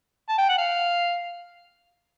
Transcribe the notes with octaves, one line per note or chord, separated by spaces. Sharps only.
A5
G5
F#5
F5